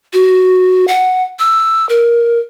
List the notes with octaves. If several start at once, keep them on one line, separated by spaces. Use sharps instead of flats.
F#4
F#5
E6
A#4